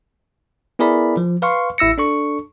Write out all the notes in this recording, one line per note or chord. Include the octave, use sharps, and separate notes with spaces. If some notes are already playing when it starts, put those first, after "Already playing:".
B3 E4 G#4 A#4 D5 B5
F3
B4 F5 C6 C#6
A1 E4 E6 A#6 C#7
D4 A4 C#6